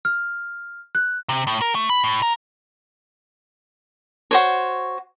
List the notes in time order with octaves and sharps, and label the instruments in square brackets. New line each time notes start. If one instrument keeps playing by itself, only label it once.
[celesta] F6
F#6
[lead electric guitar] C3
A2
A#4
A3
B5
A2
A#4
[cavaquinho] F#4 C5 C#5